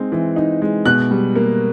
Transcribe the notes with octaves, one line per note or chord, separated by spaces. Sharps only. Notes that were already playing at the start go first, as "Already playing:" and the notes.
Already playing: G#3 C4 D#4
E3
D#4
G#3
B2 F#6
G3
A#3